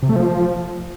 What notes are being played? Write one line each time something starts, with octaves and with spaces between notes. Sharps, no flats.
C3
A3
F3